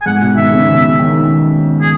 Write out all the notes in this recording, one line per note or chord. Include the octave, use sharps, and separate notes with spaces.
G#5
G#2 F#5
B2
D#3 E5
C#3
B2
D#3
G#4